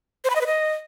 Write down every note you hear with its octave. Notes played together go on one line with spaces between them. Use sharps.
C5
B5
D#5
B4
D#5